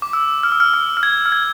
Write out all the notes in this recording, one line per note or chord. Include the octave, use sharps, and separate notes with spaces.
D6
E6
F6
E6
F6
E6
F6
G#6
F6
G#6